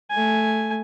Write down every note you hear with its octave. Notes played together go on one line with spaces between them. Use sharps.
A3 G#5